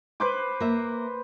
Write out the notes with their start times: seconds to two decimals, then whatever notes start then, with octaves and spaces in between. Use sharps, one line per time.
0.20 B4 C5 D6
0.61 A#3 E5